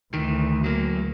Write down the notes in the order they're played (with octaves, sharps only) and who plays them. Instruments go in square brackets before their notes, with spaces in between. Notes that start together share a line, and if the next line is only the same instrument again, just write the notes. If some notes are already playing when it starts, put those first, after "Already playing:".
[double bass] D2 [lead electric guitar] D#3 E3
[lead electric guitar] F#3 A#3